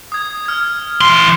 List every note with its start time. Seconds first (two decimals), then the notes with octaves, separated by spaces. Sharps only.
0.12 D#6 G#6
0.46 F6 G#6
1.01 E3 C6 C7